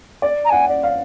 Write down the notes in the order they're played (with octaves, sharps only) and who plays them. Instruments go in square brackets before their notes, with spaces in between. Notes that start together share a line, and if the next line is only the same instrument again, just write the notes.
[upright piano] D5
[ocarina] A#5
[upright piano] F#5 [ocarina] G#5
[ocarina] D5
[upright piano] F5